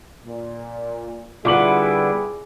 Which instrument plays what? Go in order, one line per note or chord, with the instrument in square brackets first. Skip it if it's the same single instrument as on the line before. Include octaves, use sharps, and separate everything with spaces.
[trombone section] A#2
[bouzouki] D3 B3 [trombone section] G3 E4 [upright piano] F4 D6 F#7 [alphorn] G#4